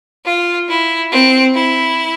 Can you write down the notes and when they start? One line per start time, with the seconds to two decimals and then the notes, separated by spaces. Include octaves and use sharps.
0.25 F4
0.68 E4
1.12 C4
1.55 E4